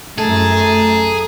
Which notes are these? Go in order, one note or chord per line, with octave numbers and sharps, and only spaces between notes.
F#2 A3 G#4 A4 A5 A#5